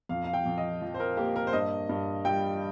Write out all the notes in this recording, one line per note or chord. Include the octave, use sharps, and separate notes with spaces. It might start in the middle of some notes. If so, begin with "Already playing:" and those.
F2 F5
F5
G5
F2
D#5
F3
C5
A#4
A#3 G4
A#4
C5
G2 D#5
G2
G3 G5